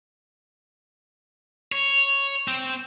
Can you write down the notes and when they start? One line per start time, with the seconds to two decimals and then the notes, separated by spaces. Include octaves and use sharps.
1.72 C#5
2.48 C4